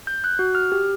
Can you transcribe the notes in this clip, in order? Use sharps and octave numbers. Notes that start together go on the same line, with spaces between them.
G6
F#6
F#4
F6
G4